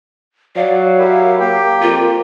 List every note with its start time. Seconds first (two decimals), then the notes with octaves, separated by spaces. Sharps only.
0.56 F#3 D5 F5
0.99 E4 G4 A#4
1.40 A#3 G4 G5
1.82 F2 F4